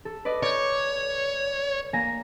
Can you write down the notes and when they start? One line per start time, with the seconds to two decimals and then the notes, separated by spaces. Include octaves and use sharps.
0.05 A4
0.25 B4 D5 D#5
0.43 C#5 D5 G6
1.93 A#3 G#5 A#6